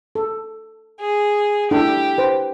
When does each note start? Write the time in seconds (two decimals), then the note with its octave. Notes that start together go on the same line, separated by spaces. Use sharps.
0.15 A4
1.01 G#4
1.71 D4 E4 G4 A4
2.18 B4 C5